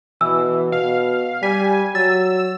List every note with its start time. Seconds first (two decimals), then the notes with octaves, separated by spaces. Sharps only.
0.21 B2 E3 E6
0.72 B2 F5
1.43 G3 G#5 B6
1.95 F#3 E6 A6